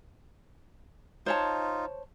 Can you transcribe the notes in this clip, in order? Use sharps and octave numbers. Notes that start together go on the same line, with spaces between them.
D#4 F4 C5 C#5 A5